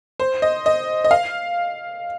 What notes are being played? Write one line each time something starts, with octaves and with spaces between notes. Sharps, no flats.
C5
D#5
D#5
D#5
F5